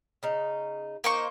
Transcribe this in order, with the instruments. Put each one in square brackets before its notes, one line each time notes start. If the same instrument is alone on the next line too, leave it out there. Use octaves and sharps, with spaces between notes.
[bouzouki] C#3 D#4
[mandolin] A#3 C5 C#6 [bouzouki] D#4